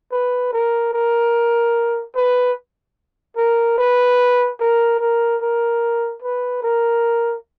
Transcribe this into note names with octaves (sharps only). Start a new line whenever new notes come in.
B4
A#4
A#4
B4
A#4
B4
A#4
A#4
A#4
B4
A#4